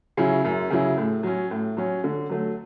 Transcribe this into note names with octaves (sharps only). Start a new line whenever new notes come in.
C#3 F#3 C#4 E4
F#2
C#3 F#3 C#4 E4
A2
F#3 C#4
A2
F#3 C#4
D3
F#3 A3